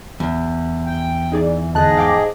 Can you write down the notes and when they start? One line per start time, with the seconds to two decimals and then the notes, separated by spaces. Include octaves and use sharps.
0.20 E2
0.86 G5
1.32 E3 D#4 G#4 D5
1.75 F2 G#2 D3 G#4 D#5 A5 F#6
1.97 F5 G5 D6